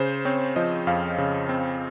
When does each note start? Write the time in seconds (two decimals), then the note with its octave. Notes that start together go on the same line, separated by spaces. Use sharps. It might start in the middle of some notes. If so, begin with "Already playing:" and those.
Already playing: C#3 C5
0.25 C4 C#5
0.56 F3 D#5
0.87 F2 F5
1.18 C#3
1.49 C4